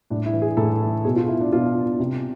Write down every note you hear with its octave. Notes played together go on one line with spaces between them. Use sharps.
A2 D4
E4
E3
G#4
A2 A4
E3
B2 G#4
F4
E4
D4
B2 F4
C3